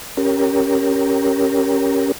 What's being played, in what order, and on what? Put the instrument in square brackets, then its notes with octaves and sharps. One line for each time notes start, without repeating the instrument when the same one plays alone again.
[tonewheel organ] C#4 G4 A#4